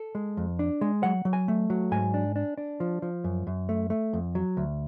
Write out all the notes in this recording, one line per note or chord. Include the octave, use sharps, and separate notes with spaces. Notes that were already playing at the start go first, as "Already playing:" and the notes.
Already playing: A4
G#3
F2
D4
G#3
F#3 F#5
F#3
G#5
A3
F#3
G#2 G#5
D4
D4
D4
F3
F3
F#2
F#2
A3
A3
F2
F#3
D2